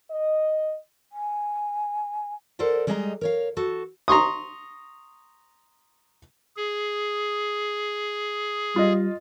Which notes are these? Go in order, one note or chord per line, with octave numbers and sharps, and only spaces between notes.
D#5
G#5
A4 A#4 C5 D5 F#5
G3 G#3 G#4 D#5 F#5 A#5
A#4 C#5 F5
F#4 A4
A#5 C6 C#6 D#6
G#4
G3 F4 D#5